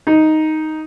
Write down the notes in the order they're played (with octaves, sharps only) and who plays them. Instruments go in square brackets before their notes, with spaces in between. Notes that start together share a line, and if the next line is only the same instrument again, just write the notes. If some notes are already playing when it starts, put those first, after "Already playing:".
[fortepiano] D#4